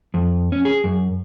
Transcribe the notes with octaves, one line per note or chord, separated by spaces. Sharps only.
F2
C#4
G#4
F#2